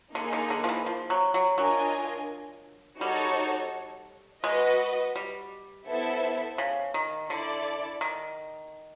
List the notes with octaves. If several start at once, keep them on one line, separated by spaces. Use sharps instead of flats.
D3 A#3 D#4 G#4
D3
D3
F3
E3
F3
F#3
F#3
F#3 D4 F4 A#4 D#5 G#5
G3 D#4 F#4 A4 C#5
G#3 F#4 B4 D#5
G3
B3 E4 A4 C5 E5
C#3
D#3
D3 E4 A4 D5
D#3